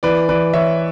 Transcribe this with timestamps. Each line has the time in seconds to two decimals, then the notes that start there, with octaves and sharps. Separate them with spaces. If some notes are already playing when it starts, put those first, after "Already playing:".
0.03 E3 B4 D5
0.29 E3 B4 D5
0.54 E3 C#5 E5